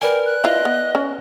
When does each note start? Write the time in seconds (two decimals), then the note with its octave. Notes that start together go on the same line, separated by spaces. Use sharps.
0.02 A#4 B4 D5 G5 G#5
0.26 F#6
0.44 E4 F4 D#5
0.65 B3
0.95 C#4